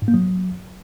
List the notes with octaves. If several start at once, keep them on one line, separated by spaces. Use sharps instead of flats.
G#2
A#3
F#3